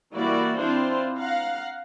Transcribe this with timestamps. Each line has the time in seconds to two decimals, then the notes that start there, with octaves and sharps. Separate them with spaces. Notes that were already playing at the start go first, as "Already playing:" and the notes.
0.14 E3 G3 A#3 E4 F#4 D5
0.58 C4 D4 E4 F4 C5
1.17 F5 F#5 A#5